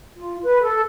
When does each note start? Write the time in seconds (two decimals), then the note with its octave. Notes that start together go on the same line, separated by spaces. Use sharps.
0.16 F4
0.43 B4
0.63 A4